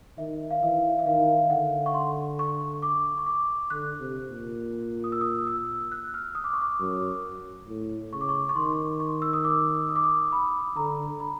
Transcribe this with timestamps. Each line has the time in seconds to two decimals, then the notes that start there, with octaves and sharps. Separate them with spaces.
0.18 D#3 E5
0.51 F5
0.62 E3 E5
0.99 E5
1.06 D#3 F5
1.50 D3 F#5
1.86 C#6
1.94 C6
2.39 C#6
2.82 D6
3.18 C#6
3.26 D6
3.70 D3 F#6
4.00 C3
4.30 A#2
5.04 D#6
5.12 E6
5.21 D#6
5.47 E6
5.92 F#6
6.14 F6
6.35 D#6
6.44 D6
6.53 C#6
6.61 D6
6.80 F#2
7.68 A2
8.12 C#3 C#6
8.21 D6
8.29 C#6
8.49 C#6
8.56 D#3 C6
9.00 C#6
9.22 E6
9.33 D#6
9.44 D6
9.89 D#6
9.96 D6
10.03 D#6
10.32 B5
10.76 D3 A#5
11.20 B5